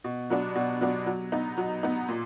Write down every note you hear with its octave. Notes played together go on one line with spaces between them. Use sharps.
B2
F#3 B3 D4
B2
F#3 B3 D4
F#3
B3 D#4
F#3
B3 D#4
A#2